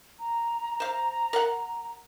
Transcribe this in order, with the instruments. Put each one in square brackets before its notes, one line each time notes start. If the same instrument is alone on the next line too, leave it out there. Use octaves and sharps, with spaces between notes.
[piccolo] A#5
[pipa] C5 F5
A#4 F5 F#5